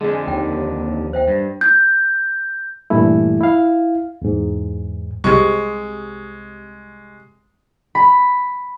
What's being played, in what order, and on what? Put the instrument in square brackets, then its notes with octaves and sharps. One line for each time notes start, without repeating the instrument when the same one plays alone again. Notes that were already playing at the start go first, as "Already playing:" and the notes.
[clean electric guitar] F2 D3 [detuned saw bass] G#3
[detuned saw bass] D#2 [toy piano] G5
[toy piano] C5 E5 G5
[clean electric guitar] G2
[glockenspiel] G6
[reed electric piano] G2 A#2 E3 G3 A3 E4
E4 F5
E2 G#2
[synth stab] C2 C3 [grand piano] G#3 C#6
[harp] B5